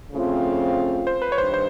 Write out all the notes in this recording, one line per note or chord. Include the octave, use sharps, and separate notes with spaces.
C#3 F3 A3 C4 F4
C5
B4
C#5
G2 D#3 C5
C5